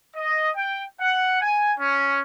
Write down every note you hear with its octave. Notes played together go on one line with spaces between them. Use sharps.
D#5
G5
F#5
G#5
C#4